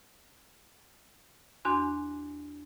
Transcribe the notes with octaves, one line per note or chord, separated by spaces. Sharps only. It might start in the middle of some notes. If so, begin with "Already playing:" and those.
E2 D4 F#4 G#5 C6